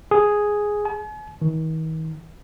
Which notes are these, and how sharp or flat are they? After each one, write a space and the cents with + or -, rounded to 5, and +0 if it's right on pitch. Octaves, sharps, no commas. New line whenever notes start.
G#4 +0
G#5 +45
D#3 +40